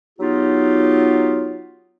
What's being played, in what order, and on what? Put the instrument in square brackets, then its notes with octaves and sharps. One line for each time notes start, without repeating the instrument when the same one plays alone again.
[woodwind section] F#3 B3 D#4 F4 G4